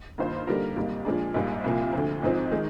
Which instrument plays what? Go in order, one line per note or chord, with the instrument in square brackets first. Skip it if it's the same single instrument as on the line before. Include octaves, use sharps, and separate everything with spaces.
[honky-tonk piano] G2 D#3 A#3 F4 C5
D3 G3 A#3 D#4 A#4
G#1 G#2 G3 A#3
A#2 F3 G#3 D4
A#1 G#2 G3 A#3
C2 A#2 F3 A#3
D2 D3 F3
G#1 G#2 F3 C4 D#4
D#3 G#3 D#4